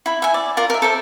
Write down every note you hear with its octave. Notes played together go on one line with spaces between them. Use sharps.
E4 B5
E5 G#5
D5
F4 A#4 D5
A#4 E5
A4 C5 E5